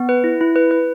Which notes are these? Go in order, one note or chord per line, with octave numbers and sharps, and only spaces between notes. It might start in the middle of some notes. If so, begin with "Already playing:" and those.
Already playing: B3
B4
E4
E4
B4
B4